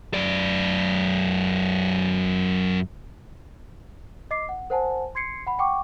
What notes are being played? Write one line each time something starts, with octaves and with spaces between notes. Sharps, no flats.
F#2 D5
D#5 D6 C7
F#5
A#4 C5 F#5 G#5 A5
C6 G#6 C7 C#7
F#5 B5
F#5 G5 C#6 D6